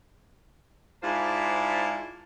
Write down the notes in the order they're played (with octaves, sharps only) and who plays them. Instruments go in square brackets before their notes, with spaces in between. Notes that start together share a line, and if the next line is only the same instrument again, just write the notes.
[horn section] G#2 E4 F4 C5 D5 A5